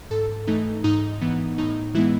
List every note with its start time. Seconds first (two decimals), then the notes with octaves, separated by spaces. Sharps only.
0.10 G#2 A4
0.47 E3 A3 D#4
0.84 G#2 D#4
1.21 E3 B3
1.58 A2 D#4
1.94 E3 G#3 B3 E4